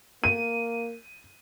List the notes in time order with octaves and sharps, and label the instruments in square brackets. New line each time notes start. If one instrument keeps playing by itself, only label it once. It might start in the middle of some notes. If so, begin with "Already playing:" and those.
[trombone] A#3 [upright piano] D#7